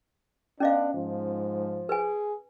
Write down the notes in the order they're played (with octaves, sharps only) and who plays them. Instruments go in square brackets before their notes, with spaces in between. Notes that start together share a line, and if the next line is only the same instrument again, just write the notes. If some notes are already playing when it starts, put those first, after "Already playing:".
[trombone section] B3 D4 [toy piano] C#4 D#5 F5
[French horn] G#2 [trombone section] F3
[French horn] G#4 [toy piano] B4 G#5